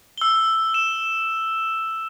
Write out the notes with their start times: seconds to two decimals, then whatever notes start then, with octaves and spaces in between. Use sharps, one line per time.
0.18 E6 G7
0.74 E7